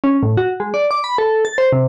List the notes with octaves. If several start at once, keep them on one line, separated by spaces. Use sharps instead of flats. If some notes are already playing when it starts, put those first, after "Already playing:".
C#4
A2
F#4
G#3
D5
D6
B5
A4
A6
C5
C3